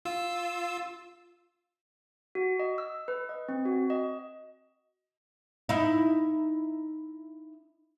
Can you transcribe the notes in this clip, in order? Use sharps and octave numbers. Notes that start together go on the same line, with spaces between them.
F4 E6
F#4
D#5
E6
B4
D#5
C4
F#4
D#5
D#4 E4